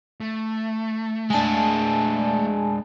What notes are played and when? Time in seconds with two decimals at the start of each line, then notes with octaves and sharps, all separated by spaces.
0.20 A3
1.30 G#3 D4 G#5 A5